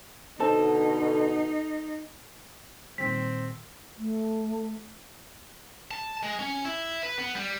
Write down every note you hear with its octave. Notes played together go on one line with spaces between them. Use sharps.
B2 D3 D#4 A4 C5 A5
A#2 D#3 G3 C4 B6
A3
A5
G#3
C#4
E4
B4
B3
G3